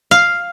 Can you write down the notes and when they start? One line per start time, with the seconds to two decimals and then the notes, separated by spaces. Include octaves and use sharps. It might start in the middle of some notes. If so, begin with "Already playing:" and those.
0.11 F5